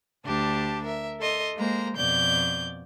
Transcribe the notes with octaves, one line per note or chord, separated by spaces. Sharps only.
D2 D4 G4 A5
A#4 E5
A4 D#5 C6
G#3 A#3 C5 A#5
F2 B2 D5 G6